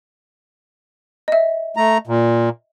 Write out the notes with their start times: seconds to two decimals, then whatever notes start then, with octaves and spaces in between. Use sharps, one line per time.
1.28 D#5 E5
1.77 A3 A#5
2.07 A#2